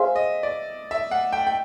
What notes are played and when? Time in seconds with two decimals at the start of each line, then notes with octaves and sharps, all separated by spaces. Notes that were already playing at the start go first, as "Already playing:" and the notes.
Already playing: G#4 C5 E5 F5 G#5 C6
0.16 D#5
0.43 D5
0.91 E5
1.11 F#5
1.33 G5
1.47 G5